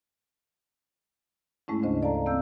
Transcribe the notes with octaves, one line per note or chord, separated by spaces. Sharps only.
G#2 G#3 A3 C#4 E4
D2 C#3 D4 C5 D#5
A4 D5 F5 A5 A#5
E3 A#3 C4 F5 E6 G6